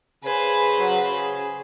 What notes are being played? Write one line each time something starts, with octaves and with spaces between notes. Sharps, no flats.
C#3 B4 C5 G#5
F#3
G#4